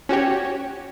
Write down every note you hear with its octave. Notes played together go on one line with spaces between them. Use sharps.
C#4 F#4 G4 C#5